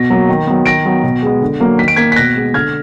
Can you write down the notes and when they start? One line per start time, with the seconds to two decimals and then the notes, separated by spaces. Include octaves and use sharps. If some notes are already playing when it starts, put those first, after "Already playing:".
Already playing: B2 A#6
0.10 F#3 A#3
0.29 D#3
0.47 F#3 B3
0.66 D#3 A#6 D7
0.86 F#3 B3
1.03 B2
1.23 G#3 B3
1.41 D3
1.60 F#3 A#3
1.79 D#3 B6
1.88 D7
1.96 A#3 G#6 B6
2.12 B6
2.16 B2 F#6 A#6
2.36 G#3 B3
2.54 D3 F6 G#6